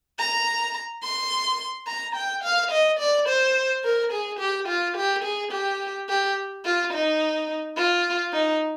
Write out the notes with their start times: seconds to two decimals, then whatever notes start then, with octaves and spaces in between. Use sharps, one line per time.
0.19 A#5
1.03 C6
1.87 A#5
2.15 G5
2.44 F5
2.71 D#5
3.00 D5
3.28 C5
3.84 A#4
4.12 G#4
4.40 G4
4.68 F4
4.97 G4
5.24 G#4
5.52 G4
6.09 G4
6.65 F4
6.93 D#4
7.77 F4
8.33 D#4